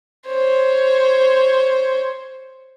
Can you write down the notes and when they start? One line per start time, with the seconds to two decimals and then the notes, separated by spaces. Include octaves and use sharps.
0.26 C5 C#5